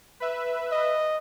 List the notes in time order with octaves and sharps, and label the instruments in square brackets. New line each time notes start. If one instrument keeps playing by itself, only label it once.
[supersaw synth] B4 E5
[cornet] D#5